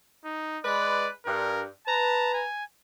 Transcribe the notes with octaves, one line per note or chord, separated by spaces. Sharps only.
D#4
G#3 B4 D5
G2 A#4
B4 A5 A#5
G#5